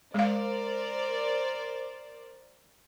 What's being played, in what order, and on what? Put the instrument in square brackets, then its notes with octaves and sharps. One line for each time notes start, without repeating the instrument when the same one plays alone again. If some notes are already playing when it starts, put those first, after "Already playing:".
[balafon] G#3 F5 [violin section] A#4 C5 D5